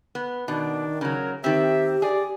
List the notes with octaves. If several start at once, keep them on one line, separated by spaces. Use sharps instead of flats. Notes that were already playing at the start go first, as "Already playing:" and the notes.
B3
B2 D#3 D4
C#3 F#3 A#4
D#3 C4 G4 E5
G#4 D5